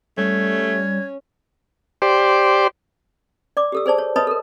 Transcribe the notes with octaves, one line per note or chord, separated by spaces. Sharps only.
G3 A3 C#4 G#6
G4 C5 D5
D5 D6
G4 A4 E6
G#4 C5 D5 A5
C#5
B4 C#5 D#5 A5 B5 D#6
A4 A#4